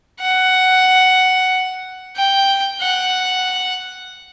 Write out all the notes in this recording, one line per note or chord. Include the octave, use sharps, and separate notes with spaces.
F#5
G5
F#5